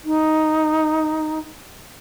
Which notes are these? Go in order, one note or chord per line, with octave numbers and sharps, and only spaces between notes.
D#4